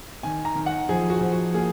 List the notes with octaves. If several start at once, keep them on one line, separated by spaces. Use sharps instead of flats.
D#3 G#5
A#5
D#3
F#5
F3 G#4
F#4
F3
F#4
A#3 G#4